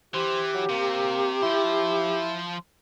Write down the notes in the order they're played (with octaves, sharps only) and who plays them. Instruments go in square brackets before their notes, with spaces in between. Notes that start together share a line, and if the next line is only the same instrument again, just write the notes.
[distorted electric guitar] E3 [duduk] G4 [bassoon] C5
[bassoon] F#3
[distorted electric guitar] C3 [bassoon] A#3
[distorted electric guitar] F3 C5 [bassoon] E4